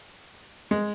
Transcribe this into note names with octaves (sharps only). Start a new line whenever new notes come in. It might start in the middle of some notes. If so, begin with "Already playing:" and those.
G#3